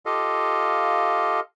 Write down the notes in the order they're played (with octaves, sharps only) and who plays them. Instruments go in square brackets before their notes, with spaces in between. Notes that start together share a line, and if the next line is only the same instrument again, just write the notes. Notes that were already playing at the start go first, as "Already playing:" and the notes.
[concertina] F4 G4 A4 D#5 F5